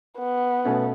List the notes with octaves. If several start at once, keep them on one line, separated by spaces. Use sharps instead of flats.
B3
B2 A3 C#4